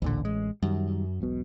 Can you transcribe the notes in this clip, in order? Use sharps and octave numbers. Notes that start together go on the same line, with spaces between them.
A1 D2 A#2 D3
G#3
F#2 D#3 G3
E1 B1 B2